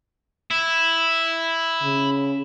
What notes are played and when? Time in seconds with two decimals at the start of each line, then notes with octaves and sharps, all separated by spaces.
0.51 E4
1.83 C#3